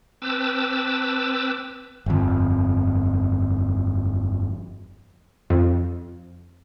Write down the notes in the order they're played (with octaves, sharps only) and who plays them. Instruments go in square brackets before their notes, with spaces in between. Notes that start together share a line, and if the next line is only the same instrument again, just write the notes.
[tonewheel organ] C4 B4 A5 D6 E6
[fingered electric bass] G1 F2
[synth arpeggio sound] F2